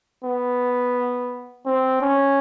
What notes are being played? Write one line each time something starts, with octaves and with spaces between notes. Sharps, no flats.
B3
C4
C#4